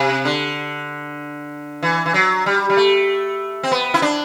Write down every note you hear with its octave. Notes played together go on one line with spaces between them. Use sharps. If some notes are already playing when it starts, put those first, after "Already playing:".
Already playing: C3
D3
E3
E3
F#3
G3
G3
A3
C4
B3
E4
D4